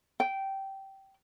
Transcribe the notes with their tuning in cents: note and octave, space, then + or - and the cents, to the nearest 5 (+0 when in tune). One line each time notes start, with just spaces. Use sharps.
G5 -15